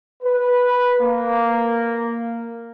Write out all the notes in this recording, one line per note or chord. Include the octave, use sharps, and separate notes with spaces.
B4
A#3